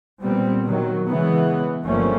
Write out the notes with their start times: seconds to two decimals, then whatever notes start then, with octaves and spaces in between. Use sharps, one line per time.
0.21 A#2 G3 B3 C4
0.66 D#3 F#3
1.06 C#3 E3 G#3 B3
1.84 G1 F3 G3 A3 A#3 C#4